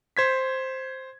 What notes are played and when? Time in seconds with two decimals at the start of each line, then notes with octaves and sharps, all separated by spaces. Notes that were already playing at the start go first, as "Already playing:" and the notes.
0.17 C5 G#6 B6